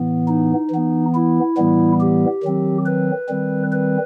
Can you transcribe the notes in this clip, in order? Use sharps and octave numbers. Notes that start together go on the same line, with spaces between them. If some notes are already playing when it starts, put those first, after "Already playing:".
Already playing: A2 E3 B3
D#4
E3 B3
E4
A2 E3 G3 B3
G4
D#3 F#3 C4
B4
D#3 G3 C4
B4